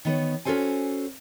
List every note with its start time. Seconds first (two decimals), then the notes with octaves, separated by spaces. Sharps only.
0.05 D#3 B3 C#5
0.45 C#4 D4 F#4 A4 C5 G#5